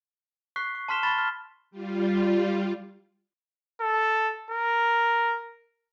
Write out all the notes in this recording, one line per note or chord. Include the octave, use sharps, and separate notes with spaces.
C#6 F#6 B6 C7
C#6
A5 C6 F6 B6 E7 G7
B5 C#6 A6 E7 G7
F6
G3 F4
A4
A#4